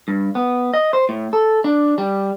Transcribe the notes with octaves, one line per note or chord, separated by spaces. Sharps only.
G2
B3
D#5
C5
A2
A4
D4
G3